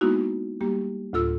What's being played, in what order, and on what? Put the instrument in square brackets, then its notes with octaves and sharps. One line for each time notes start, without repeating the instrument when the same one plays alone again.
[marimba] G#3 A#3 B3 D#4 E4 F#4
G3 A#3 G4
D2 A2 F4 A4 E6